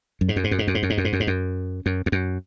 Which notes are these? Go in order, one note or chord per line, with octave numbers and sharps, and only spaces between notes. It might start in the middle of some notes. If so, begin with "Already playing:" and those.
F#2
G#2
F#2
G#2
F#2
G#2
F#2
G#2
F#2
G#2
F#2
G#2
F#2
G#2
F#2
F#2
F2
F#2